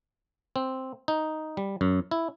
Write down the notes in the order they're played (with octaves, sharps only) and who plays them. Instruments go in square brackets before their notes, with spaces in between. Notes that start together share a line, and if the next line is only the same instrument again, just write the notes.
[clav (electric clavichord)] C4
D#4
G3
F#2
E4